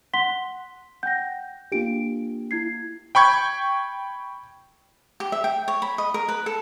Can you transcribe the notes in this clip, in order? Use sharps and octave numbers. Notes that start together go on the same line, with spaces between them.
F#5 C6 B6 G7
F#5 G5 G6 A#6
A#3 D4 F4 G4 D7
E4 G#6 C7
G5 B5 C#6 G6 G#6
G4
E5
G5
C#5
B5
D#5
A#4
B4
A4